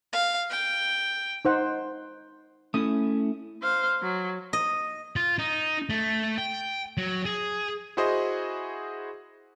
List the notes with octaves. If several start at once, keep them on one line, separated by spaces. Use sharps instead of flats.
F5
G5
D#4 C5 F#5
A3 C#4 E4 D#6
C5 F5
F#3
D#5
F4
D#4
A3
G5
F#3
G#4
E4 F#4 G#4 C5 D#5